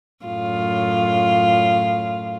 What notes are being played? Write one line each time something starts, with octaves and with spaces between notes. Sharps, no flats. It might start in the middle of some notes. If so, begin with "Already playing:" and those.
F#2 A2 F4